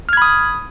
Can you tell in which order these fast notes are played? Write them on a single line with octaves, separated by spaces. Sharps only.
F6 G#6 B5 D#6